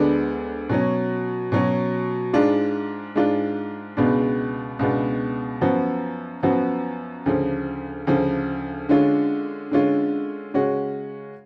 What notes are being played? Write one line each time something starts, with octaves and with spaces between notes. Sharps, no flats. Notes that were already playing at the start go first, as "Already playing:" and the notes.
Already playing: D2 D3 G#3 B3 D4
B2 F#3 C#4
B2 F#3 C#4
G#2 G#3 D4 F4
G#2 G#3 D4 F4
C#2 B2 G#3 B3 D4
C#2 B2 G#3 B3 D4
F#2 F3 B3 F#4
F#2 F3 B3 F#4
D2 C#3 F3
D2 C#3 F3
D3 G#3 C#4 F4
D3 G#3 C#4 F4
C#3 G#3 C#4 F#4